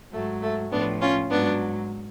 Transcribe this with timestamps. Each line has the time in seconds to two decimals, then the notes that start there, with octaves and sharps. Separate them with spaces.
0.13 G#2 F#3 A3
0.42 A3
0.71 A2 F3 B3 D4
1.01 C#4 F4
1.30 G#2 F#3 B3 D4